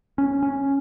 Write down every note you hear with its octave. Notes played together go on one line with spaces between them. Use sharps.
C#4
C#4